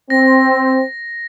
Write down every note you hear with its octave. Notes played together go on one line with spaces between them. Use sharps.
C4 A#6